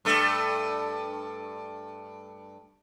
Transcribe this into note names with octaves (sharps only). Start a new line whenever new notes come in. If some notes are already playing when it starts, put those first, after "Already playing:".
G2 A3